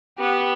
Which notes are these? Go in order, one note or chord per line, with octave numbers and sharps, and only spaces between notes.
B3 G4